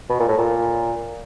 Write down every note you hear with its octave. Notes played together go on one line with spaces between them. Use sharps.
B2
A#2
A2
A#2